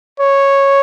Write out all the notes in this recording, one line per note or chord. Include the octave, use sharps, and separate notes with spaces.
C#5